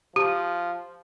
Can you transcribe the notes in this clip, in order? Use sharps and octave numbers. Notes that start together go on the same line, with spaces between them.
F3 G4